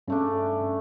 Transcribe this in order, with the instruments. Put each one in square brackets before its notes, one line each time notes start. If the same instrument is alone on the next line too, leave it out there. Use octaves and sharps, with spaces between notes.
[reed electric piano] G2 C#4 [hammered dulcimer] C#3 A3 D4